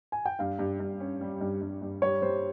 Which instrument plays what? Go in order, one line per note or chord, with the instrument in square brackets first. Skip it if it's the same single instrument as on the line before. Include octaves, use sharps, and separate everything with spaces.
[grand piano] G#5
G5
[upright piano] G2 [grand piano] F5
[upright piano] G2
G2
C#4
G3
G2
G2
G2
[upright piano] G3 [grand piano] C#5
[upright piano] G3 [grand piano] C5